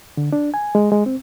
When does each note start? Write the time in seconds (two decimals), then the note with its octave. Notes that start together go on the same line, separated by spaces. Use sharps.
0.17 D3
0.33 D4
0.54 G#5
0.75 G#3
0.92 G#3
1.06 C4